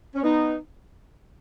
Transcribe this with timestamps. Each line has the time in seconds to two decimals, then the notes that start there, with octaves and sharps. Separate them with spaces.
0.15 C#4
0.23 B3 D#4